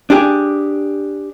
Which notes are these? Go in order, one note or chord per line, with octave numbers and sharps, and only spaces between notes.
D4 G4 G#4